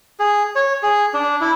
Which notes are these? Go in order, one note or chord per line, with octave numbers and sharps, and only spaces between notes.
G#4
C#5
G#4
D4
E4